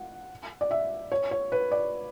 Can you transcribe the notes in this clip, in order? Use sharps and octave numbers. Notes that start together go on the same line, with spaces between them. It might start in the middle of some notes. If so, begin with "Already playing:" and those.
Already playing: F#5
D5
E5
C#5
C#5
B4
D5